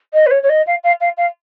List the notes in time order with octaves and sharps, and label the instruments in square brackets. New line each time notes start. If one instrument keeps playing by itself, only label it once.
[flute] D#5
B4
C#5
C#5
D#5
F5
F5
F5
F5